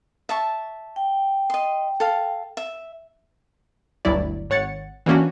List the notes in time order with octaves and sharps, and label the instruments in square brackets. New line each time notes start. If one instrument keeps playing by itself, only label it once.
[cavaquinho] E5 A5 C#6
[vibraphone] G5
[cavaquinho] D#5 C6
A4 F5
E5
[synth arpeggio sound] G1 D2 G2 F#3 E4 D5
G#1 C#5 F#5 A6 C#7
E3 G3 A#3 C#4 D4 F#4